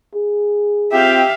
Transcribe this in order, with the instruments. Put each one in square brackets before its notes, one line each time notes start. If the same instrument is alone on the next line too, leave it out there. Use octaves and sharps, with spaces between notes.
[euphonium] G#4
[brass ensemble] C4 F4 G5 [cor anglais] G4 [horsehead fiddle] E5 F5